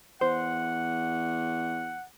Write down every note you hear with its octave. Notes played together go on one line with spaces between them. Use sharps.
E2 C5 F#5